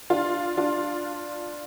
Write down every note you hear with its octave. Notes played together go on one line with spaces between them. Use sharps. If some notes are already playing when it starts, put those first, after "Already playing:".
D4 F4
D4 F4